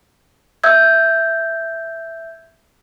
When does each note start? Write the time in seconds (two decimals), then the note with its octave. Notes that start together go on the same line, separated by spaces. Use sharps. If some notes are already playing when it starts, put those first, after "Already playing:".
0.64 E5 E6 G6 G#6